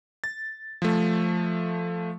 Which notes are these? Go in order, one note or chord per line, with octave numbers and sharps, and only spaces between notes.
A6
F3 A3